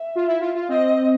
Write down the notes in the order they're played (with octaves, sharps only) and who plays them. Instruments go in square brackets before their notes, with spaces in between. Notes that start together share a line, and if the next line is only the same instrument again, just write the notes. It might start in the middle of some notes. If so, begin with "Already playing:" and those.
Already playing: [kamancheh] E5
[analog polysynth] F4
E4
F4
F4
[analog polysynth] C4 [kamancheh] D#5